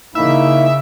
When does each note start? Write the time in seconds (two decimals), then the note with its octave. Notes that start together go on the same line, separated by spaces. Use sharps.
0.15 C#3 A#3 D#4 E4 E5